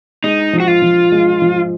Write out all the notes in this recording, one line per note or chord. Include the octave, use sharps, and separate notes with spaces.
G#3 D#4
F3
F#4
F4
F3
G#3
F3